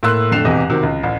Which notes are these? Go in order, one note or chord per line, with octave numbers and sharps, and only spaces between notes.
A2 A#3 C6 E6 F#6
F2 D3 A3 C7 E7 F7
E1 C3 E3 G4 D#5
C3 D#3 C4 F#4 G4
C#2
A1